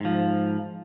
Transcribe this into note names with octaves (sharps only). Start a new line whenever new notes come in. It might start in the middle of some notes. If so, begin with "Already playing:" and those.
G#2 F3